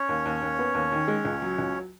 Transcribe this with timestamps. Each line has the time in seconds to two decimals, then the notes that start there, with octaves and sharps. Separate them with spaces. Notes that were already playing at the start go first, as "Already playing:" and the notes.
Already playing: C#4 C#5
0.09 D#2
0.25 D#2
0.42 D#2
0.59 B3
0.74 D#2
0.92 D#3
1.08 G#3
1.25 C#2
1.42 F#3
1.59 C#2